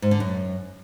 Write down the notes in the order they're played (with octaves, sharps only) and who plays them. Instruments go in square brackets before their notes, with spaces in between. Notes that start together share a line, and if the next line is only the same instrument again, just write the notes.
[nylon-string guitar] G#2
D3
F#2